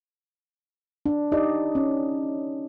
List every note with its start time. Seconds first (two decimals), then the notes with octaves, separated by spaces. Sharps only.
1.06 D4
1.32 D#4 G4 D5 D#5
1.75 C#4